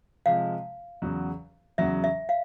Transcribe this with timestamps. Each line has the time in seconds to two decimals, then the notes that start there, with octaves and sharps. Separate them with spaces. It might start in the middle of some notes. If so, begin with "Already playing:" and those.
0.26 C3 F3 G#3 F5
1.02 E2 C#3 F#3
1.78 E2 C#3 F#3 E5
2.04 E5
2.29 F5